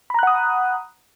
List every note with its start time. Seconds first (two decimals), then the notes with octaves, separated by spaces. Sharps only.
0.10 B5
0.14 A#5
0.19 F#6
0.23 F#5
0.27 D#6